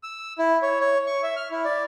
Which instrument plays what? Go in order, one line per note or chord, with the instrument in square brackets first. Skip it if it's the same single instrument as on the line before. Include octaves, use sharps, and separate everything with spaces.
[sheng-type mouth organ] E6
E4
C#5
C#5
C#6
E5
F6
E4
D5